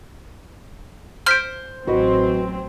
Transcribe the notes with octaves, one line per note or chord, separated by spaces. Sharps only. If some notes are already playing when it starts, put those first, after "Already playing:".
C5 F6 B6 D7
A1 F#3 C4 F#4 B4 D#5